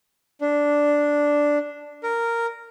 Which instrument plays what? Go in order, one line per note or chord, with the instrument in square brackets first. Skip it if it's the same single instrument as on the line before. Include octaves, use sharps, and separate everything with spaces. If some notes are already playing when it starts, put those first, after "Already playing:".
[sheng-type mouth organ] D4
A#4